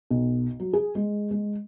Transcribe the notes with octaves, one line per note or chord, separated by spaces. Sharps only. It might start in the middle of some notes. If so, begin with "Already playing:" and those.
B1
F#3
G#4
G#3
G#3